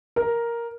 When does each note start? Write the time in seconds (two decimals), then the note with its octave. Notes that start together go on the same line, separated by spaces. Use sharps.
0.16 A#4